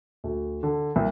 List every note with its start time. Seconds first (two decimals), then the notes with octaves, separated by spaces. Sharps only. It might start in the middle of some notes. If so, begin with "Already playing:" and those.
0.24 D2
0.63 D3
0.96 C2